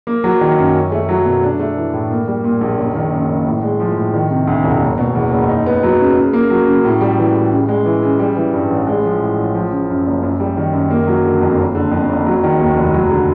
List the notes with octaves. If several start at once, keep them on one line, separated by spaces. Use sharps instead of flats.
A#3
F#3
D#3
F#2
C#4
A3
F#3
B2
D4
A3
E3
A2
A#3
G3
A#2
A#1
F#1
D#3
F#2
F#1
A2
G#3
F3
A2
D#3
C3
D2
E1
F#1
B2
E2
F#1
D#4
B3
F#3
C#3
C#3
A#3
F#3
C#3
A2
G3
E3
A2
C#3
G#3
E3
C#3
G3
E3
G2
A1
G#3
F3
A2
A1
F3
C#3
F#2
F#1
F#2
G3
D#3
F#2
A#3
F#3
D3
F2
F#1
D3
F2
F#1
F#3
D#3
D#2
F1
F#3
D3